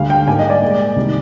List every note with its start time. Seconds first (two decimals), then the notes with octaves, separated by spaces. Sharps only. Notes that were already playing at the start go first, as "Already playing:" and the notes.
Already playing: D2 D3 G3 F5
0.10 G5
0.27 G#2 G3 A#3 G#5
0.39 D#5
0.50 D5
0.62 A#2 G#3
0.96 C2 C3 D#3 G3